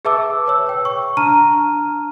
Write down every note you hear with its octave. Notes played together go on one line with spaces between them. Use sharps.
G#4 B4 E5 A5 D6 E6
B4 C#5 E6
C#5 G5
C#6
D4 A5 A#5 F6 D#7